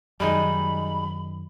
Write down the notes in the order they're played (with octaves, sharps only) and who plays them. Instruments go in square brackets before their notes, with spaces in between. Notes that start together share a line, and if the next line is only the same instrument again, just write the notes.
[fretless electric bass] F#2 D#3 [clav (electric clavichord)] G3 G#3 D#4 [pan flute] B5